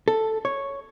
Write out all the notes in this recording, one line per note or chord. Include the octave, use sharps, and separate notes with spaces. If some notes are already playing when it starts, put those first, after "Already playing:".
A4
C#5